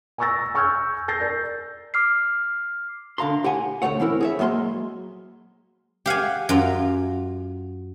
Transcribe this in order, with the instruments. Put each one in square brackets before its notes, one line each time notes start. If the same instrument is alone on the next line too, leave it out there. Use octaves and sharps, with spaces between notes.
[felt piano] G#5 A#5 C#6 E6 A6 A#6
G#5 C#6 E6 F6 G6 G#6
G6 A6 A#6 C7
A#4 D5
[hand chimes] D6 F6 C7
[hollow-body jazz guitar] D3 F5 A#5 C6
G4 F#5 G#5
D2 C3 A3 C#5 F#5
E3 C4 E4 A#4
G#4 C#5 E5
F#3 G#3 A#3 G#5 C6
[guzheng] G4 F5 F#5 G#5
F#2 F4